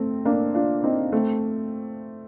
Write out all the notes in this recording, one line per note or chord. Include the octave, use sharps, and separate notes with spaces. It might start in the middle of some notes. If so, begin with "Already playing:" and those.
Already playing: A3 C4
A#3 D4
D4 F4
C4 D#4
A3 C4